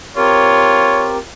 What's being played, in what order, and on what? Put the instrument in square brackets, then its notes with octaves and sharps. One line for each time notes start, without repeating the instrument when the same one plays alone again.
[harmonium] C4 G4 A#4 [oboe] F4 [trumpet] C#5